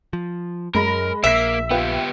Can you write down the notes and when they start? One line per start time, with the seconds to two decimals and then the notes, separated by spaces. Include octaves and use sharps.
0.13 F3
0.74 F#2 G#3 A#4 B5 A#6
1.24 A#1 A#3 E5 E6 B6
1.71 B3 F4 G4 B4 G5